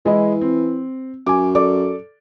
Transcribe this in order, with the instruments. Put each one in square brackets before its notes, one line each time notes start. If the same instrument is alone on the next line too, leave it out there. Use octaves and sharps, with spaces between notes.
[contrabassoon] E3 [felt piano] G#3 E4 D#5
[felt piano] C4
[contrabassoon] F#2 [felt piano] G#5 D6
[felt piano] A4 D5 D6